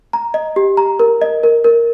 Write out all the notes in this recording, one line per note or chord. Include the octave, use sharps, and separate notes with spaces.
A#5
D#5
G4
A#5
A#4
D#5
A#4
A#4